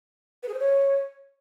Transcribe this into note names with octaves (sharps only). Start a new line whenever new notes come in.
B4
G#4
C5
C#5